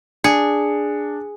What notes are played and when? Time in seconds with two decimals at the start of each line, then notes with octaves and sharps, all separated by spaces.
0.24 D4 G#4 C#7